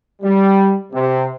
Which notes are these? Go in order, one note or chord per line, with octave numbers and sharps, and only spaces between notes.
G3
C3